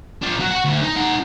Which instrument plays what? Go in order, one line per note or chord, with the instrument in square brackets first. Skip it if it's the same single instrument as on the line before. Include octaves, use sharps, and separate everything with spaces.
[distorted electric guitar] D4 F4
F#3
F#4 F#5
D2
D#4
D#4 F#5